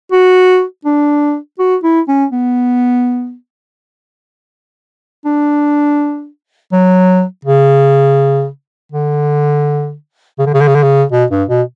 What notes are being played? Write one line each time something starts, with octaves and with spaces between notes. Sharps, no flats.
F#4
D4
F#4
E4
C#4
B3
D4
F#3
C#3
D3
C#3
D3
C#3
D3
C#3
D3
C#3
B2
G2
B2